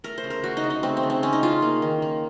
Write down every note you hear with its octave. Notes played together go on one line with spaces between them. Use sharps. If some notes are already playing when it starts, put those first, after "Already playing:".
A3 A#4
C5
C#3
A#4
A3 F#4
D#4
C#3
D#4
A3 C4
C4
C#3
C4
A3 C#4
D#4
C#3 F4
A#3
D#3
A#3